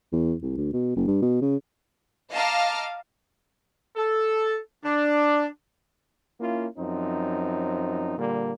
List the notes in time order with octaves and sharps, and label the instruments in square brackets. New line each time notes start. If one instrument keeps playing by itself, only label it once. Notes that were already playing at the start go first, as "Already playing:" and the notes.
[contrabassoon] E2
C2
D2
B2
F#1
G2
B2
C#3
[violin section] D#5 F5 A5 A#5 D6 F6
[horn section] A4
D4
[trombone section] A#3 C#4 E4 F4
F#2 F3 C4 D#4
A#2 D3 G3 A#3